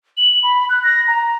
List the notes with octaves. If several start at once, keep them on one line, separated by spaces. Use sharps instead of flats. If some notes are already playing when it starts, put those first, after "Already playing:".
F#7
B5
F#6
A#6
A#5